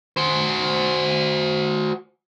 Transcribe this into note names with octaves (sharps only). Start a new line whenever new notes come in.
F#4 C5